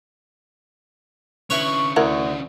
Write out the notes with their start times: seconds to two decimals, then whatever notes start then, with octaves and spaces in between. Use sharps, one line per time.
1.50 D3 C#4 E4 B4 C#5 C#6
1.96 D2 E4 A#4 F#5